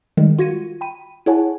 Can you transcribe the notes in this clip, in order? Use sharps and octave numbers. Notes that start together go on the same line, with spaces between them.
D#3 G3 G#3
F4 F#4 G#6 A#6 C#7 D#7
G5 B5 D#7
E4 G#4 C#5 F#5 G#5 A5